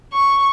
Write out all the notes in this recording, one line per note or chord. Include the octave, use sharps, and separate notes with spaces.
C#6